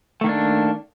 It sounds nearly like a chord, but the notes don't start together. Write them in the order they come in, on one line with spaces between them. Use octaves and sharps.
A3 D#3 A#3 D4